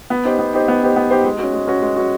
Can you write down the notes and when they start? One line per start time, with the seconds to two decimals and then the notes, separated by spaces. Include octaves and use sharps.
0.10 B3
0.25 D#4 G4 C5
0.39 B3
0.53 D#4 G4 C5
0.68 B3
0.82 D#4 G4 C5
0.96 B3
1.11 D#4 G4 C5
1.25 G#3
1.39 C#4 F#4
1.53 G#3
1.67 C#4 F#4
1.82 G#3
1.96 C#4 F#4